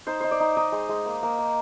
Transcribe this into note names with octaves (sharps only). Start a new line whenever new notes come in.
D#4 C5
D#4 C5
D5
D#4
D#4 D#5
G#3
G#3
A#3
A#3
A#3